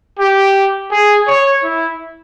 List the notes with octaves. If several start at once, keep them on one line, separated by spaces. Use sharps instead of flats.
G4
G#4
C#5
E4